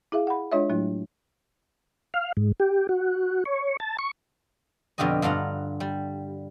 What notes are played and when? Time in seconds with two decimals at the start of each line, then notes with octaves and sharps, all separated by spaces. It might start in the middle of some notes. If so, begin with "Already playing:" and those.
0.12 E4 G#4 E5 F5
0.27 F#5 B5
0.52 G#3 D4 F4 C#5 D#5 E5
0.69 A2 F#3 A3 D4 E4
2.14 F5
2.37 G#2
2.60 G4
2.89 F#4
3.46 C#5
3.80 A5
3.99 C#6
4.98 F2 B2 D3 F4 G4 D#5
5.22 G2 D3 F4 F#5 A#5
5.80 G3